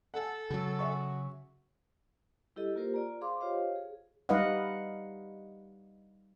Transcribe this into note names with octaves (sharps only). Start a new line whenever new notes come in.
A4 F#5 G#5
C#3 F#3 F#4
G#4 E5 C#6
G3 E4 G4 A4 D#5
A#3 F4 G4 A#4 C5
F4 D5 A#5
G#4 C5 F5 C6 D6
F4 G4 C5 C#5 D#5 F5
G#4
G3 D#4 B4 D#5 F5 F#5